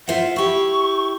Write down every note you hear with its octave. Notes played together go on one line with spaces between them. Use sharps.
F4 C5 E5 F#5
E4 G4 C#6